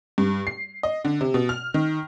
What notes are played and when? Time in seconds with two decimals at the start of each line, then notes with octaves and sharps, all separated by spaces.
0.18 G2
0.47 C7
0.83 D#5
1.05 D3
1.21 C3
1.34 B2
1.49 F6
1.74 D#3